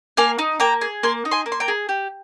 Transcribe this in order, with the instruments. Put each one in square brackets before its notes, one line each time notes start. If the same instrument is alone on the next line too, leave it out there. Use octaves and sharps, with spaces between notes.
[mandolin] A#3 F5 G#5
D#4
A#3 G5 A#5
G#4
A#3 G#5 C6
D#4
G#5 C6
A#3
C6
G5 A#5
G#4
G4